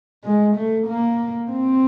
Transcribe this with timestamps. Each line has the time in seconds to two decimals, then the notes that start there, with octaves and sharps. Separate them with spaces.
0.24 G#3
0.55 A3
0.87 A#3
1.51 C4